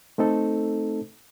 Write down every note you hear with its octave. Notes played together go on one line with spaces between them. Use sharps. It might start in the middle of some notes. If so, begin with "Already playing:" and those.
A3 C4 D#4 A4